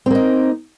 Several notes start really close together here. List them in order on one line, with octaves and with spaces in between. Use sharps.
C4 A#3 D#4